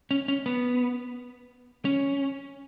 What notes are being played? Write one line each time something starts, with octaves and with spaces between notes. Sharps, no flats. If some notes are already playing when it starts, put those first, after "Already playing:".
C#4
C#4
B3
C#4